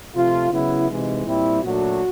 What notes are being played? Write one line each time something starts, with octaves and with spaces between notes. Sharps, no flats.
C3 F3 A3 F4
C#3 F#3 B3 E4
C3 E3 G#3 D#4
A#2 G3 C4 E4
A#2 F#3 A3 D4 F#4